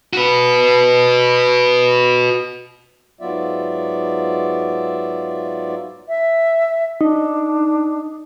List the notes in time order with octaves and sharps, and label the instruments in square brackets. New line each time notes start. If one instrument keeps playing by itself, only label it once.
[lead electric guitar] F#4 B4
[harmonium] G#2 F#3 B3 F4 D5 E5
[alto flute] E5
[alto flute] D4 [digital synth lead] D#4